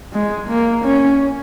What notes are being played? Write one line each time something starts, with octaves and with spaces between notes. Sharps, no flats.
G#3
A#3
C#4